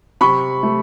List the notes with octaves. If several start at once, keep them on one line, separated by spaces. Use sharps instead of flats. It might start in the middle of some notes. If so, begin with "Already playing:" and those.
C3 B5 C#6
A3